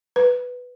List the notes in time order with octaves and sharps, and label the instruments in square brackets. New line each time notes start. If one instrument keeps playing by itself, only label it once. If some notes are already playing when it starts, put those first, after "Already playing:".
[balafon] B4